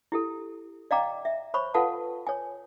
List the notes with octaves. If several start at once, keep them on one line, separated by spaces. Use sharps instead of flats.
E4 G4 A4
D5 D#5 F5 G5 A#5 D6
E5
C5 C#5 B5 C#6
F4 A4 B4 F5 F#5 A5
C#5 G#5